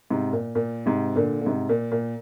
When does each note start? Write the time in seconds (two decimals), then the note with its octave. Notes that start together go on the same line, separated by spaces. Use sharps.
0.11 G#2 C3
0.33 A#2
0.55 A#2
0.86 G#2 C3
1.16 A#2 D3
1.41 D3
1.46 G#2 C3
1.69 A#2
1.92 A#2